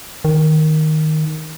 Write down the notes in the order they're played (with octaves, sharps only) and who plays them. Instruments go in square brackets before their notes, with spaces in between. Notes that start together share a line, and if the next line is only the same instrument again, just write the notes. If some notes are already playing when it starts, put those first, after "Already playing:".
[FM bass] D#3